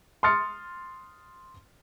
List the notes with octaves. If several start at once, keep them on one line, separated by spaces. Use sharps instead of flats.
C6 D#6 F6 A6 C#7